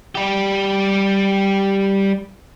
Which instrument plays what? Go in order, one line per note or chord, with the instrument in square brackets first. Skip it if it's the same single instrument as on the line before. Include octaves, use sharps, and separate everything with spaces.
[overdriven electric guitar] G3 G4